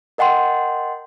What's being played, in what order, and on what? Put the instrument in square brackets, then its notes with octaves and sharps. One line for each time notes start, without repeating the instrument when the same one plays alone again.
[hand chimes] A#4 D#5 F#5 G5 C6